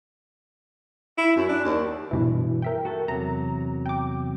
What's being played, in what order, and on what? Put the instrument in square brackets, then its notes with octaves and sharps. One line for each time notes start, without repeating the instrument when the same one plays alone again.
[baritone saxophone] E4
F#2
D4
D#2
[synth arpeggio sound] G2 B2 E3
A#4 E5 G5
[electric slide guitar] F#4 A4
[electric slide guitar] E2 C3 F#3 [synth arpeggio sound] A#5
[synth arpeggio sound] G5 D6